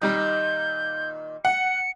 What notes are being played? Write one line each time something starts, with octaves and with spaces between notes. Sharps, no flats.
A#2 D#3 G3 D#4 G6
F#5 C#7